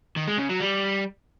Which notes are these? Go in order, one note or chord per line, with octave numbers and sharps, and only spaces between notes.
D#3
G#3
C#3
F#3
G3